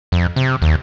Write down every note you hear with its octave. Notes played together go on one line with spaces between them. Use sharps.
F2
C3
D#2